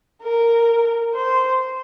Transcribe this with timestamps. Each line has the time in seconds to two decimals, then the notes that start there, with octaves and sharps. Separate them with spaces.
0.22 A#4
1.15 C5